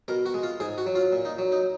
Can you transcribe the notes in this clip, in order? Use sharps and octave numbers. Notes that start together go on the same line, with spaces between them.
B2 A#4
F#4
G#3
F4
G#2 G#4
F#4
F#3
F4
A#2
D#4
F#3
D#4